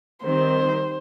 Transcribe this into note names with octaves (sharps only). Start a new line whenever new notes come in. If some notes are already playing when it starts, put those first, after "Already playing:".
D#3 G3 C4 C5